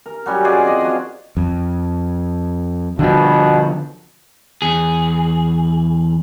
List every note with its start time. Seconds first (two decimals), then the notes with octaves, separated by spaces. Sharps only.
0.06 A#4
0.26 F#3 G3 C#4 F#4
0.44 F4 G#4 D5 D#5
0.65 C4 D5 D#5
0.81 F3 F#4
1.37 F2
2.99 G2 B2 D3 F3
4.62 E2 G#4